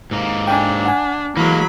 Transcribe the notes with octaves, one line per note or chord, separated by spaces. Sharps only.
G#2 A#3
D4 G5 G#5
F#5 G#5
E3 F#3 G#3 A#3 B5